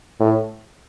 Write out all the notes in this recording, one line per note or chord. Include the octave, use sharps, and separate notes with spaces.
A2